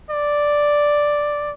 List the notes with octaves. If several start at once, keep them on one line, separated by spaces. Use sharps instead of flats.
D5